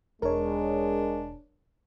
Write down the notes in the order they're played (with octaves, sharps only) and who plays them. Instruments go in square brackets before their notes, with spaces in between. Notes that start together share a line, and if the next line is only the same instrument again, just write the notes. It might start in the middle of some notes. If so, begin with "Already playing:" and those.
[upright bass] E1 D#4 [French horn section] G#3 [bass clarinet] D4 [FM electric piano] A#4 C#5